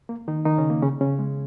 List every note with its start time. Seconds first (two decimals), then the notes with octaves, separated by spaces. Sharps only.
0.09 A#3
0.28 D#3 D#4
0.45 D#3 D#4
0.58 C#3 C#4
0.70 A#3
0.82 C#3 C#4
1.01 C#3 C#4
1.19 G#3